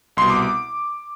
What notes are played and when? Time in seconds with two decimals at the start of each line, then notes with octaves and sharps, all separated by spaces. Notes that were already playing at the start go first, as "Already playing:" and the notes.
0.17 C2 B2 C6
0.30 D6
0.42 D6